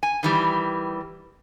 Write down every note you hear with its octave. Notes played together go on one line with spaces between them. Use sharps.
G#5
D#3 E3 G3